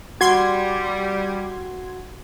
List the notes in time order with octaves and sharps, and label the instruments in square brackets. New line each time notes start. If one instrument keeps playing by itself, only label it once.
[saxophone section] G3 [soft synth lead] F#4 [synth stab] C6 G#6